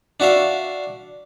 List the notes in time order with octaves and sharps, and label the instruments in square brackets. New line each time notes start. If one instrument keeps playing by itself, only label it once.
[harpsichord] D4 F#4 E5 F5